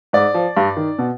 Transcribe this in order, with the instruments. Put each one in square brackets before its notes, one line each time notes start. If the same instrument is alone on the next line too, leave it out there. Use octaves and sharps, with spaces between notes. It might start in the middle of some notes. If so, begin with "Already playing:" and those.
[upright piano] G#2 D5
F3
G2
D#3
B2